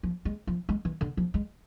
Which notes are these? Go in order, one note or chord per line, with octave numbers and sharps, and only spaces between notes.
F3
G#3
F3
G#3
E3
D3
F3
G#3